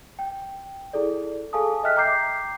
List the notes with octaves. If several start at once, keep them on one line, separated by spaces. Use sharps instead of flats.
G5
E4 G#4 A4 D5
G#4 A4 F5 G#5 A5 D#6
D#5 E5 G5 F6 F#6 B6
G5 A#5 D6 G6 C7